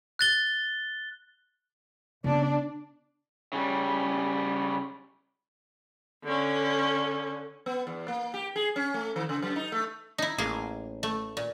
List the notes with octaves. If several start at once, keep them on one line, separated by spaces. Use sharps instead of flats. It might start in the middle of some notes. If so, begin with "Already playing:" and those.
F#6 A6 G7
C#3 B3 D4
C#3 G3
D3 C#4
B3
E2
A#3
G4
G#4
C#4
A3
D#3
C#3
F#2
D#4
A3
D#4 E4
A1 A#3 G#4
A3
A#2